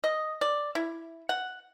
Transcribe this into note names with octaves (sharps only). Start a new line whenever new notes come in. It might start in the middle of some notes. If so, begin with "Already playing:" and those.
D#5
D5
E4
F#5